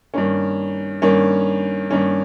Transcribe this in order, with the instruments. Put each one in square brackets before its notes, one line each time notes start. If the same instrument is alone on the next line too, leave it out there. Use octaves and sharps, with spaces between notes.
[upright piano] G2 D#3 A#3 C#4
G2 D#3 A#3 C#4
G2 D#3 A#3 C#4